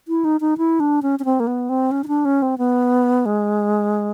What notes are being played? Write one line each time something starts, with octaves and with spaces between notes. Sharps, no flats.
E4
D#4
D#4
E4
D4
C#4
C#4
C4
A#3
B3
C4
C#4
D#4
D4
C#4
C4
B3
G#3